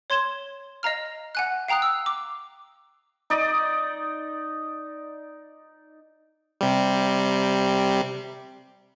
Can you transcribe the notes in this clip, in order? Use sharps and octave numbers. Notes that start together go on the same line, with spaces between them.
C#5 C6 G#6 E7 G7
D#5 F5 A#5 F6
F#5 G#5 F#6
F5 G5 A#5 D#6 F#6
E6
D6
D#4 D5 D#5
C3 G3